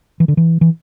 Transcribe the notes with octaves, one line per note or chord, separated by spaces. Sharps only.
E3
D3
E3
E3